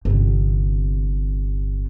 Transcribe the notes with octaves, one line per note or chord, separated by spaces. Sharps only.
G1 C3